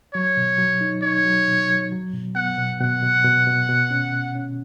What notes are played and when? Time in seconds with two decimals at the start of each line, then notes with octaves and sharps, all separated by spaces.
0.14 F#3 C#5
0.37 B2
0.58 F#3
0.81 D#4
1.03 D#4 C#5
1.25 F#3
1.47 B2
1.70 F#3
1.92 F#3
2.14 B2
2.35 B3 F#5
2.58 B2
2.80 B2 F#5
3.03 B2
3.25 B2
3.47 B2
3.69 B2
3.91 C#4
4.13 B2
4.35 C#4